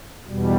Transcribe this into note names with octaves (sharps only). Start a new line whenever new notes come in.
E2 B2 G3